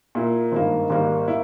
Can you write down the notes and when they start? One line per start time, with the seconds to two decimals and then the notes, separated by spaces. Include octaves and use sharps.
0.15 A#2 A#3 E4
0.52 G#1 G2 D#3 A#3
0.90 G#1 G#2 G3 A#3
1.28 A#3 E4